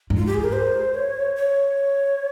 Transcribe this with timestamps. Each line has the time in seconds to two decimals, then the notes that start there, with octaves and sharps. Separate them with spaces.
0.10 G#2
0.17 F4
0.26 G4
0.34 G#4
0.44 A#4
0.53 C5
0.94 C#5
1.36 C#5